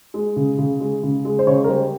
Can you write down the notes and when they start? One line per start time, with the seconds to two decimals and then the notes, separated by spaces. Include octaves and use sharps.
0.14 G#3
0.36 C#3
0.58 C#3
0.80 G#3
1.03 C#3
1.25 G#3
1.39 C5
1.47 C#3 C#5
1.64 A#4
1.69 G3 C5